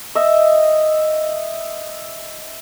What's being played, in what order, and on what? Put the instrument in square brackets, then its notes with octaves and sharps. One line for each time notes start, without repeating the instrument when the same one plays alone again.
[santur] D#5 E5